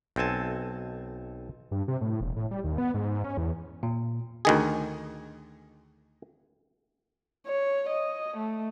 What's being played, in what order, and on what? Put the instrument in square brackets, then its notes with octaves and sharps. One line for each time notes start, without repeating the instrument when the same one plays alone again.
[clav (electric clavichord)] B1 C4 A4 G#5 A5
[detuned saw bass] G2
C3
A2
E1
A2
G3
D#2
B3
G#2
C#4
E2
[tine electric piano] A#2
[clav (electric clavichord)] D2 D#3 G#4
[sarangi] C#5
D#5
A3